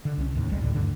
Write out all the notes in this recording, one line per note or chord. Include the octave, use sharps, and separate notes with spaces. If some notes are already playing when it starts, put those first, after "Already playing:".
D3
C2 C#4
D#2 A2
F1 B1 G3 G#3
C#2 A2 D3 G3
D2 G2 D3